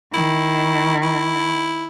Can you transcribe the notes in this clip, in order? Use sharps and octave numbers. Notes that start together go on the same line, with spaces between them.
D#3 E4
E4